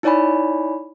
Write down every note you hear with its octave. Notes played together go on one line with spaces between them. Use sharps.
D#4 E4 C#5 D5 G#5 B5